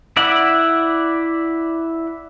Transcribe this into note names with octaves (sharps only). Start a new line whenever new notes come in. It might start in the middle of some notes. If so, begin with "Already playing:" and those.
E4 D5 E5 F#5